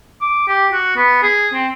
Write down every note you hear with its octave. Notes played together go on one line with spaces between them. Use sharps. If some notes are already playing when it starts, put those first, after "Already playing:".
D6
G4
F#4
B3
G#4
C4